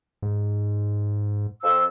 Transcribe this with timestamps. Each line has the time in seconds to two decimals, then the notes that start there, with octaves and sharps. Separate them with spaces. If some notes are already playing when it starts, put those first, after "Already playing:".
0.22 G#2
1.63 F2 F3 E6